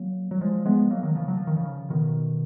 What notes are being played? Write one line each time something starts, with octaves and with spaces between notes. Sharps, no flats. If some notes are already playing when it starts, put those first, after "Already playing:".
Already playing: F#3 A#3
F#3
F3 G#3
G#3 B3
F#3 A#3
D#3 F#3
C#3 F3
F#3
F3
D#3
C#3 F3
B2 D#3